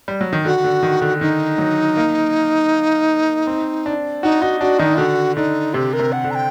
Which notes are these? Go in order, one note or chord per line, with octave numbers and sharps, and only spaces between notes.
G3
F#3
D#3
D3 F#4
D3
D#3
D3
D#3 D#4
F#3
A#3
C4
D4
D#4 F#4
D#4 F#4
D4 F#4
D#3 D#4
D3 F#4
D3 D#4
C3 G4
A#4
C3
F#5
D3
A#5
G5